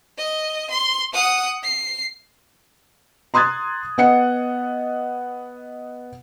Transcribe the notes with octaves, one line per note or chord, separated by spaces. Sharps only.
D#5
C6
F#5 D#6
C7
A#5 C6 D#6 F#6 G#6 A6
B3 D#5 F#5 C#7